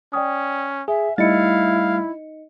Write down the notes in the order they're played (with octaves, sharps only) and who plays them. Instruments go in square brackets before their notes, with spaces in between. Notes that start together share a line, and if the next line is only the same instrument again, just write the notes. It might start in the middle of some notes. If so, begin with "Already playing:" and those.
[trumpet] C#4 [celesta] D5 G5 D#6
[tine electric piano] G#4 [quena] E5 [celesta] G#5
[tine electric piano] G3 A3 A6 [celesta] D#4 D#5 C#7 [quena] E4 [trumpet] F5